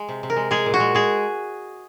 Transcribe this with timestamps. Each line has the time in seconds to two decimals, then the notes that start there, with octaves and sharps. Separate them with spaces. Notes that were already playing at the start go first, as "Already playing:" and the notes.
Already playing: G#3
0.09 C3
0.23 C3
0.30 A#4
0.36 G#3
0.51 G#3 G#4
0.66 A#2
0.74 F#4
0.80 G#3
0.95 G#3 G#4